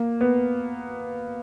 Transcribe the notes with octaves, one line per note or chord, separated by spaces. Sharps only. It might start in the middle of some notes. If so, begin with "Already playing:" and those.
Already playing: A#3
B3